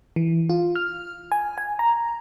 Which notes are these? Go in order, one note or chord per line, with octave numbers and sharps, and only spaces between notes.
E3
F4
F6
G#5
G#5
A#5